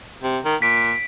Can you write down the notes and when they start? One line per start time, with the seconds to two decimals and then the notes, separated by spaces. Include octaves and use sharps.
0.22 C3
0.45 D#3
0.62 A#2 B6 D7